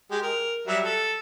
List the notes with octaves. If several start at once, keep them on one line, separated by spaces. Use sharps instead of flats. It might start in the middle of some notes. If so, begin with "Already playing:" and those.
G#3 G4
A#4
F#3 G3 E5
A4